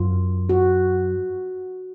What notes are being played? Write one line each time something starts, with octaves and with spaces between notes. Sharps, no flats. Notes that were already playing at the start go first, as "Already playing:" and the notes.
Already playing: F#2 F4
F#4